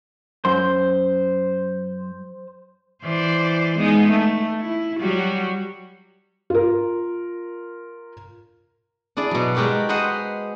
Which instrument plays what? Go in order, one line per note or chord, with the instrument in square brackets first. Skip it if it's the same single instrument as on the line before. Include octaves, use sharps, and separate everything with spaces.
[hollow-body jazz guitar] F#2 [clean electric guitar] C5
[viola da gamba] E3 C5 D5
G#3 B3 D#4
A3
E4
F#3 G3 F#4
[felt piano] F4 A#4
[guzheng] D4 E4 G#4 D5
B2 F#3
G#3 F#4 G4 A#4 D5
G#4 B4 C5 D#5 F#5 A#5